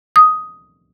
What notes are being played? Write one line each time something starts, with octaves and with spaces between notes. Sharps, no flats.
D#6